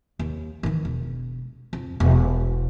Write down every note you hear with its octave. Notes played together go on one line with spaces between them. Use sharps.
D#2
D#3 E3
E1
F2
E1